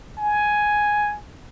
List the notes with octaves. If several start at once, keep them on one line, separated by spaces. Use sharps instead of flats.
G#5